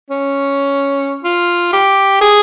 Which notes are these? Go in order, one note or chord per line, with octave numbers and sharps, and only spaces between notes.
C#4
F4
G4
G#4